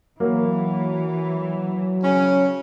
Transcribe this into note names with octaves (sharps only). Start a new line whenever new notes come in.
E3 F#3 A#3
C#3 C#4